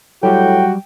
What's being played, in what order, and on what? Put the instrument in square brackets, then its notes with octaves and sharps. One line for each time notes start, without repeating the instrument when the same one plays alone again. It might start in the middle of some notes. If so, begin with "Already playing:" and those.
[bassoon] A2 [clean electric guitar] F#3 G3 [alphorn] F#4 [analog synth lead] G5